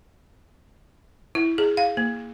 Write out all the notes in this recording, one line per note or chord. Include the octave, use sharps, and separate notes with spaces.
E4
G#4
F5
A#3